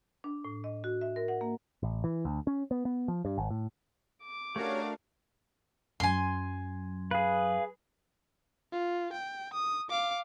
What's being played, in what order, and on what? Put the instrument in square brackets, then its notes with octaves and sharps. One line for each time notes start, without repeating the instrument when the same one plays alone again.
[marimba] D4
A2
D#5
F#4
E5
A#4
F#5
A#3
[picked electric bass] A1
E3
D2
C#4
B3
B3
F3
G2
G#1
A2
[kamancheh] D6
[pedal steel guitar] A3 D4 [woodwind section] C#4 G4 C#5 [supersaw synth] F#4 A#4 F5
[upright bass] F#2 F#3 [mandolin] G#5 C6
[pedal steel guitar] G#4 B4 [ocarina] F5
[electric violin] F4
G5
D#6
F5 D6